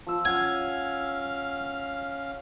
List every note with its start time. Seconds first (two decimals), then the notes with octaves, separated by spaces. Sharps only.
0.07 F3 E6
0.25 C#4 F5 F#5 G#5